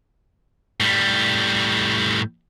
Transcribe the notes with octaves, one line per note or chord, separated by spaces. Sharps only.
A2 G3